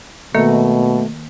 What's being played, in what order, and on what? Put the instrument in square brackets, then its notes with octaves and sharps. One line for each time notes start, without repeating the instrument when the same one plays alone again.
[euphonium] B2 [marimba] D#3 A#3 A#4 [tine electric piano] A3